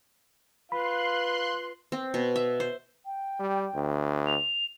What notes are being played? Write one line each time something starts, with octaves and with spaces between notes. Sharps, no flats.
F4 B4 F5 B5 C6 F#6
C4
B2
E5
C5
G5
G3
D2
F7